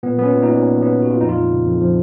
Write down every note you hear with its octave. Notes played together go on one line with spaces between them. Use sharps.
A#2 B3
F#3 B3
C#4
A#2
A#2 D#4
A#2 C#4
F#3 B3
A#2
F#4
A#2 F4
F2 D#4
F4
F3
C#3
F2
F3